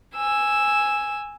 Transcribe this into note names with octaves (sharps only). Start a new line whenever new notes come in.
G#5 E6